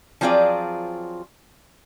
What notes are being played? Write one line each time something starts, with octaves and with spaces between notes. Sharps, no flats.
F3 F#3 C4 F4 G#4 D5